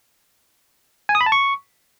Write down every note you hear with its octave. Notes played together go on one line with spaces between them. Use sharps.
G#5
D#6
B5
A5
C#6